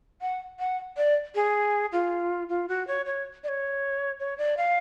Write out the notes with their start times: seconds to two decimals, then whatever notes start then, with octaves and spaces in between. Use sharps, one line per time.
0.22 F#5
0.59 F#5
0.97 D5
1.35 G#4
1.92 F4
2.49 F4
2.68 F#4
2.87 C#5
3.06 C#5
3.44 D5
3.48 C#5
4.20 C#5
4.38 D5
4.57 F5